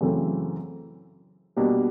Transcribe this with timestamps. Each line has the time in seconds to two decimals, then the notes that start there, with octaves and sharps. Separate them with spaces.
0.01 F#2 C#3 E3 A3 C4
1.56 B2 G3 A#3 D4